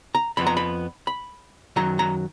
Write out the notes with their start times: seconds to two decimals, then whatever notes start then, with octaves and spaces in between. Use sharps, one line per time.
0.15 A#5
0.37 F2 F3 B3 B5
0.47 A#5
0.57 B5
1.07 B5
1.76 F#2 D#3 F#3 A#5
1.99 A#5